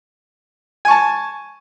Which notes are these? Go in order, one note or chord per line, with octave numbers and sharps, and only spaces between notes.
G#5 A5 C#6